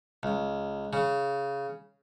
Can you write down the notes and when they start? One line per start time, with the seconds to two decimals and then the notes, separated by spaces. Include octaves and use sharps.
0.23 C#2
0.93 C#3